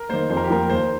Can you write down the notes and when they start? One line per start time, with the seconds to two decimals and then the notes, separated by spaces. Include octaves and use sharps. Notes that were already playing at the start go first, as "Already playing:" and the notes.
Already playing: A#4
0.09 D#3 A#3 C5
0.30 F2 C5
0.37 A#4
0.44 G4
0.50 F3 A#3 A#4
0.70 D#2 C5